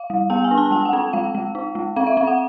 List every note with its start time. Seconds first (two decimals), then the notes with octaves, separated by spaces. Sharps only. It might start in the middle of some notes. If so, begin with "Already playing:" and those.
Already playing: F5
0.10 G3
0.30 B3 G5
0.44 G#5
0.51 D4
0.58 A5
0.71 G#3 G5
0.85 F#5
0.93 C4
1.13 G#3 F5
1.35 G#3
1.55 D#4
1.75 G#3
1.96 C4 F5
2.07 E5
2.17 C4 F5
2.27 F#5